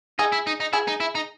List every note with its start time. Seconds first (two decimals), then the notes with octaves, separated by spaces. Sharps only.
0.19 D#4 G#4
0.32 E4
0.47 D#4
0.60 D#4
0.73 E4 G#4
0.88 D#4
1.00 E4
1.15 D#4